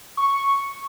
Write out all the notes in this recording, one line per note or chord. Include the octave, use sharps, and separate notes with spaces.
C#6